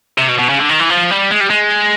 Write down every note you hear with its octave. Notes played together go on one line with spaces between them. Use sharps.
C3
B2
B2
C#3
D3
D#3
E3
F3
G3
G#3
G3
G#3